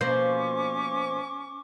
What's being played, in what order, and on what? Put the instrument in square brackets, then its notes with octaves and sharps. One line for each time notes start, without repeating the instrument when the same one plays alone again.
[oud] B2 F3 A#3 [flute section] C#4 C#6 D6 [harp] C5